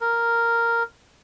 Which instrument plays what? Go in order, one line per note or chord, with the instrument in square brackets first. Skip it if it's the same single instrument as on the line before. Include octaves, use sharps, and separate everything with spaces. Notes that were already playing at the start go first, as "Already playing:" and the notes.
[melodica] A#4